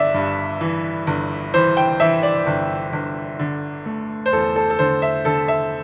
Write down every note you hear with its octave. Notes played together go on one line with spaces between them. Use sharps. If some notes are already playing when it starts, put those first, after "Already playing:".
Already playing: G1 D5 E5
G2
E3
G1
E3 C5
G5
E3 E5
D5
G1
G1
D3
A3
C5
E2 A4
A4
A4
D3 C5
E5
D3 A4
E5